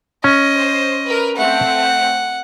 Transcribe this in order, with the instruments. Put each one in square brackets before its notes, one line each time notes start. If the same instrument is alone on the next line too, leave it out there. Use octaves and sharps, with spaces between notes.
[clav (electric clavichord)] C#4 [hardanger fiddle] D#5
[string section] C5
A#4 B4
[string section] A3 C4 [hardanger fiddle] F#5